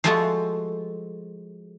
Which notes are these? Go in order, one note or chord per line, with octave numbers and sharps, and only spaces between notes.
F3 G#3 A3 F4 F#4 A4